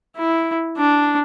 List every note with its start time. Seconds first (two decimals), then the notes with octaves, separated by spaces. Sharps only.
0.17 E4
0.78 D4